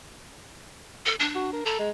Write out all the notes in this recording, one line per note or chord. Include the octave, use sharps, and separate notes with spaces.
A4
D4
F#4
A#4
A4 A#5
G#3